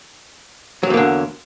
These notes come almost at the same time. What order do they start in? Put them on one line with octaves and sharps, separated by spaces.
F#3 G2 E2 A#3 D3